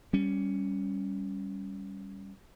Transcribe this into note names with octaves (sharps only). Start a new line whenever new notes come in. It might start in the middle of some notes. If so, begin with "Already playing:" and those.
G3 C#4